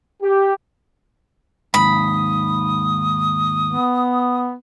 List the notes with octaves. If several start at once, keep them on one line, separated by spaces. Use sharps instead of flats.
G4
D#2 G#2 B5 D#6
B3